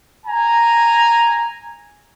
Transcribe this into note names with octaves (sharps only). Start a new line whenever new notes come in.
G#5 A#5